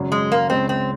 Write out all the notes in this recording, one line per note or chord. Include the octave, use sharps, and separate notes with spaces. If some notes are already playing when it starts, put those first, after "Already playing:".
Already playing: G#1 F#2 C#3 F#3 C#4
G#3
A#3
C#2 C#3 G#3 C4
C4